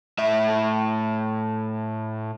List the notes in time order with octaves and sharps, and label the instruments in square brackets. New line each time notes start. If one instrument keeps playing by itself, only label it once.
[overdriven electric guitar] A2 E5